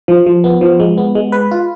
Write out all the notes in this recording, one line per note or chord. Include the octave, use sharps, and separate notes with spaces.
F3
F3
B3
F3
G#3
B3
G#3
B4
F4